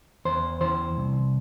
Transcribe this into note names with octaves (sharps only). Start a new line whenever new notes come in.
E2 C5
E3 C5
C2